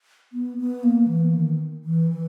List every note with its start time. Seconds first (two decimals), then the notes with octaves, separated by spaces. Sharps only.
0.33 B3
0.58 B3
0.83 A#3
1.08 E3
1.34 D#3
1.84 E3
2.10 E3